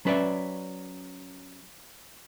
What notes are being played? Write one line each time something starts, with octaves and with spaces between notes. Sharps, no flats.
F#3 C#4 B4 C#5 D5 E5